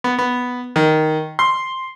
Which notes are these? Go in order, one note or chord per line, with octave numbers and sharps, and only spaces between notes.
B3
B3
D#3
C6